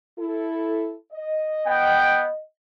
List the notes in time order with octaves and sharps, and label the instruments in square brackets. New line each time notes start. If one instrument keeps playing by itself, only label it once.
[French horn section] E4 A4
D#5
[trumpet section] B3 G5